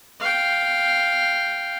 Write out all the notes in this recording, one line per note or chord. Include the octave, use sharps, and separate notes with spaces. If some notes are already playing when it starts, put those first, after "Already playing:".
F5 G5